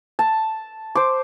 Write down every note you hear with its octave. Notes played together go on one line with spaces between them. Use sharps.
A5
C5 D6